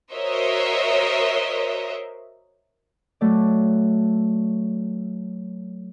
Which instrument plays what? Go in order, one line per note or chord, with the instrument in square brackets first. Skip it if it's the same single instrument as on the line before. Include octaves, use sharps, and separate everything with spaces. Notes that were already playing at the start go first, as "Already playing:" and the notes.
[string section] F#4 A#4 C5 C#5 D#5 E5
[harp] F#3 A3 D5